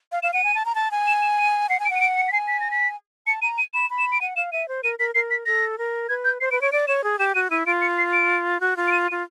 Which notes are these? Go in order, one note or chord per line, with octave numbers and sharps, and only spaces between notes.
F5
F5 E7
F#5 D#7
G#5
A5
A#5
A5
G#5
E7
E7
D#7
F#5 C7
G#5
D7
F#5
D#7
D7
C#7
B6
G#5 C7
B6
A#6
B6
A5 C#7
A#5 D#7
D#7
B5 E7
B5
E7
D7
F#5 D#7
F5 E7
E5 D#7
C5
A#4 D#7
A#4 B6
A#4 C7
B6
A4 A#6
A#4
B4 G#6
G6
C5 C7
B4 D7
C#5 D7
D5 D7
C#5 E7
G#4
G4 E7
F#4 D#7
E4 D#7
F4 D7
C#7
C7
D7
F#4
F4
D7
D#7
D#7
F4